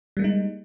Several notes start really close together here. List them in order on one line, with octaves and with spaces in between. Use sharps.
G3 A#3 G#3 D#4